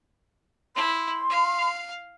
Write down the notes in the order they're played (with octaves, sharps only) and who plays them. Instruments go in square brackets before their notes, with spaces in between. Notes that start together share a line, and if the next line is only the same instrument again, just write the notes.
[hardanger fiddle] E4 [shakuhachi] C6
[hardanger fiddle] F5